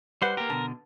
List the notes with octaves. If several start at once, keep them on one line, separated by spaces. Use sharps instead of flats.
G3 B4 C5 F#5 C6
A#3 G4 A#4
B2 D3 A5